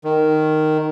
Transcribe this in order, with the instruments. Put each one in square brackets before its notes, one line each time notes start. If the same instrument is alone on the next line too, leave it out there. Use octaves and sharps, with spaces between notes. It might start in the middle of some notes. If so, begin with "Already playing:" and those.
[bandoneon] D#3